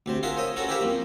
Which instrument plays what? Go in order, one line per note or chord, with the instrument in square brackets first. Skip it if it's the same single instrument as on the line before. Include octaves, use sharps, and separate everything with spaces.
[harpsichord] D2 C3 C5
F4 G#4 A#4 E5 F#5
C5 C#5 D#5 E5
C#4 F#4 A4 A#4
E4 G4 A#4 C5 E5 F5
F2 A#3